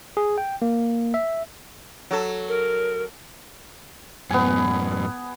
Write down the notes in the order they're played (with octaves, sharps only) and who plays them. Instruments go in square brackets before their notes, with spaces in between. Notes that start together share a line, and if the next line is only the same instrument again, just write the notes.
[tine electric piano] G#4
G5
A#3
E5
[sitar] F#3 A4
[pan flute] A#4
[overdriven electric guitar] F#2 A2 [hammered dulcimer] B3 G#5